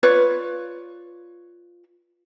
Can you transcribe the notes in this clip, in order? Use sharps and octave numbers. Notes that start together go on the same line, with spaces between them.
F4 B4 C#5 D5